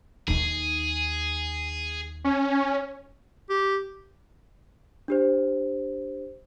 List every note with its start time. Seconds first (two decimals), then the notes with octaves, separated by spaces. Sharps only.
0.28 D#2 D#4 G#4
2.24 C#4
3.49 G4
5.08 D4 G4 C5